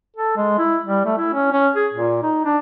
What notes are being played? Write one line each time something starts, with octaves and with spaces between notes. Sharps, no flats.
A4
G#3
E4
G3
A3
E4
C#4
C#4
G#4
A#2
D#4
D4